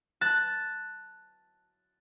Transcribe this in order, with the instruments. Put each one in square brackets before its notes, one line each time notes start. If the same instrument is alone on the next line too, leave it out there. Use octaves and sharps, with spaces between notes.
[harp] A5 F#6 A6